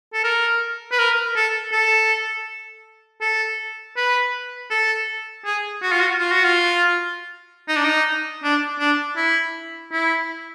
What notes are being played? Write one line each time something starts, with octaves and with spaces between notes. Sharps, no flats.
A4
A#4
B4
A#4
A4
A4
A4
B4
A4
G#4
F#4
F4
F#4
F4
F#4
F4
D#4
D4
D#4
D4
D4
E4
E4